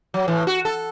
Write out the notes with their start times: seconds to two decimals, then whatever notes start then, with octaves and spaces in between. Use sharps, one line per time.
0.14 F#3
0.28 A2 E3
0.47 F#4
0.65 A4